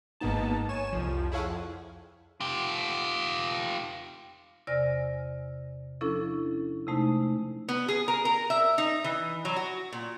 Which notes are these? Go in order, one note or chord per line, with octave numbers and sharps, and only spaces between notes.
G#1 G#2 A#3 B3 D#4 A5
C#5 G#5 E7
C2 F2 F3
E4 G#4 A4 C#5 F5 F#5
F2
F4 G4
E2 C3 D5 G#5 F6 A#6
F3 C#4 D4 E4 A4
C3 G#3 A3 D#4 A5
B3
G#4
A#4
A#4
E5
D#4
E3
F#3
F#4
A#2